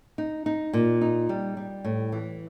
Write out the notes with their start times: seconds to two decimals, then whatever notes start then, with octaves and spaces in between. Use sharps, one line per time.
0.18 D#4
0.46 D#4
0.73 A#2
1.01 D#4
1.29 G3
1.57 G3
1.85 A2
2.12 E3